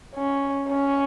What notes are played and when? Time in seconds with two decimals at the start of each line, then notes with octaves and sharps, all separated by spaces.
0.15 C#4
0.69 C#4